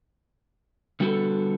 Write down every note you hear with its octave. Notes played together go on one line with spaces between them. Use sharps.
D3 G3 B3 F#4 A4